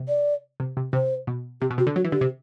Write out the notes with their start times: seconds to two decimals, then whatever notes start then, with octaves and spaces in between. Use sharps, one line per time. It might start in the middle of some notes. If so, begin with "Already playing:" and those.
Already playing: C3
0.08 D5
0.60 C3
0.77 C3
0.93 C3 C5
1.27 B2
1.61 C3 G4
1.70 B2
1.78 C3 F#4
1.87 D3
1.96 F#3 F#4
2.05 E3
2.12 D3 G4
2.21 C3